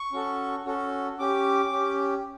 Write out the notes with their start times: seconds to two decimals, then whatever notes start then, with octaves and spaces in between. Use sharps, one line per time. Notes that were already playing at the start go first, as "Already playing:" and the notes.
Already playing: C#6
0.12 C#4 F#4 A4
0.66 C#4 F#4 A4
1.19 C#4 G4 D6
1.72 C#4 G4